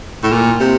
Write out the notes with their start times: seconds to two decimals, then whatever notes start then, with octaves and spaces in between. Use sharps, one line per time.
0.23 A2
0.32 A#2
0.60 C3